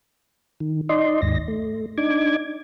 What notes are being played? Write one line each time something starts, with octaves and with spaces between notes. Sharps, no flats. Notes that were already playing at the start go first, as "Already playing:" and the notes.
D#3
D#4 D5 D#5 C6
D#2 G#2 A#6
A3
D4 D#4 D6 G#6